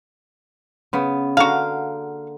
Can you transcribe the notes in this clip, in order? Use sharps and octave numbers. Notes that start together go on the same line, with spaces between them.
C#3 B3
D3 A#3 F#4 F5